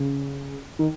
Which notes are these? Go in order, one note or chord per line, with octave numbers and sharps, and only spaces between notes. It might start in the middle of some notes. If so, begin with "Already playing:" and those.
Already playing: C#3
D#3